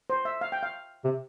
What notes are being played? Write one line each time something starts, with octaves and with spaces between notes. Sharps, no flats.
C5
E5
F5
G5
F5
C3